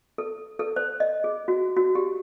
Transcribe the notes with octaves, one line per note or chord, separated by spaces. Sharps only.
A4
A4
C5
D#5
G#4
F#4
F#4
G4